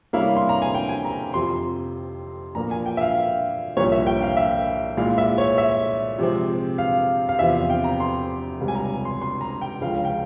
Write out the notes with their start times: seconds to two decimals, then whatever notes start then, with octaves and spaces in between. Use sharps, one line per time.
0.13 C3 G3 A#3 C#4 E4 F5
0.37 C6
0.49 A#5
0.62 G#5
0.74 G5
0.89 G#5
1.05 A#5
1.34 F2 C3 F3 C4 C6
2.55 A#2 F3 A#3 A#5
2.71 G#5
2.86 G5
2.97 E5
3.01 F5
3.15 F5
3.77 C2 A#2 F3 A#3 C#5
3.92 E5
4.07 G5
4.22 F5
4.37 E5
4.97 A#2 G#3 E4 F5
5.18 E5
5.38 C#5
5.58 E5
6.18 C3 F3 G#3 C4
6.78 F5
7.29 F5
7.39 E2 C3 F3 C4 E5
7.55 F5
7.70 G5
7.84 A#5
8.00 C6
8.61 C#2 C3 G3
8.68 G#5
8.75 A#5
9.05 C6
9.21 C6
9.41 A#5
9.61 G5
9.81 C#2 C#3 F3 F5
10.05 G5